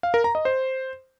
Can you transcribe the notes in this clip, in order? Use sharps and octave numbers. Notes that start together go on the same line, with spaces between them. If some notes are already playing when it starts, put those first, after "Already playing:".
F5
A#4
A#5
D#5
C5